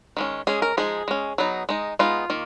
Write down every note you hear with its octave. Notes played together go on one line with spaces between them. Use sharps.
D#3 G#3 C#4
G#3 C#4 G#4
A#4
F3 G#3 D#4 G#4
G#3 C#4
F#3 B3 D#4
G#3 D#4
G#3 B3 D#4 F4
D#3 A#3